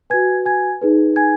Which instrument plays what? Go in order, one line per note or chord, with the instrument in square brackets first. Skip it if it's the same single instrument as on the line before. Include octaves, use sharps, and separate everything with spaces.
[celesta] F#4 B4 G#5 G#6
G#5 G#6
D#4 G#4 B4
G#5 G#6